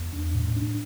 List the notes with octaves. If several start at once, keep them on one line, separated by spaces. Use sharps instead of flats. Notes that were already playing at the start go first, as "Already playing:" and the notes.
Already playing: E2
D4
A2
D4